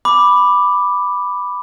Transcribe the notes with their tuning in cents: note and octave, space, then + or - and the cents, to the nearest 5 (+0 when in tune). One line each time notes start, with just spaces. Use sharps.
B5 +0 D6 +5